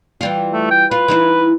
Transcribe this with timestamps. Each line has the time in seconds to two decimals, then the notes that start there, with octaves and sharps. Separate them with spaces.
0.21 E3 G3 F4
0.53 A3
0.71 G5
0.91 F4 B4
1.08 E3 D#4 E4